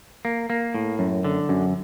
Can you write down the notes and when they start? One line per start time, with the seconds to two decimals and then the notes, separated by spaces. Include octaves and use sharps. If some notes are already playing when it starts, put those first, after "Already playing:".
0.25 A#3
0.50 A#3
0.74 A2
0.99 F#2
1.24 D3
1.49 F#2